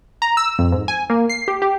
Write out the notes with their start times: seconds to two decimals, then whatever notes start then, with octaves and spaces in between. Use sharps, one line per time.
0.22 A#5
0.37 E6
0.59 F2
0.72 G#2
0.88 G#5
1.10 A#3
1.29 C7
1.48 G4
1.62 G4